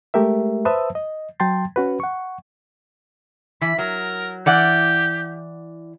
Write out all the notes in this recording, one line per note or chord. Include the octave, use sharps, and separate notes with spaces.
G#3 A3 G4 A#4 E5
B4 C5 E5 A5 D#6 E6
D#5
F#3 G5 A5 C6 A6
C#4 F#4 B4
F#5 C#6
E3 B5
F#3 A#4
E3 G4 D5 F#5